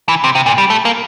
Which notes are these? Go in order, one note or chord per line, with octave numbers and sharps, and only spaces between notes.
E3
C3
C3
A#2
G3
A3
A#3